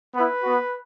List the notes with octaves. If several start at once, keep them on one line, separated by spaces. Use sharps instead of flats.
B3 E4 B4
B3 F#4